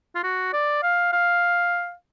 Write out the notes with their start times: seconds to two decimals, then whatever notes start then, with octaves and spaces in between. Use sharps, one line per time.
0.15 F4
0.23 F#4
0.53 D5
0.83 F5
1.13 F5